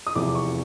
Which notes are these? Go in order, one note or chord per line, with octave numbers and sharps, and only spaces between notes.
D#6
F1 E2 C3 F3 D6
C#6